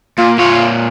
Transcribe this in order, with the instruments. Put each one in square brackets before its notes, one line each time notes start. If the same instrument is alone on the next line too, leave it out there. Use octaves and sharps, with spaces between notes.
[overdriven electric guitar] A#2 [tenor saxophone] F4
[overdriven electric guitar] A#2 C#5 [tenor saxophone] F4